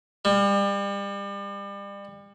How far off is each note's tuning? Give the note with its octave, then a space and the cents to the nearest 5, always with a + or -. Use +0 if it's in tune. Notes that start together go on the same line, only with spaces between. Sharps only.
G3 +35